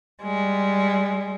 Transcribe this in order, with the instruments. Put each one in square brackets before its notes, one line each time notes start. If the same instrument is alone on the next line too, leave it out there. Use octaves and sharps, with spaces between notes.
[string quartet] G3 G#3